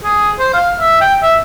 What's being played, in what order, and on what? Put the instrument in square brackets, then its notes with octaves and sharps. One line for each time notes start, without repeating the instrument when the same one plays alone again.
[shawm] G#4
C5
F5
E5
G5
E5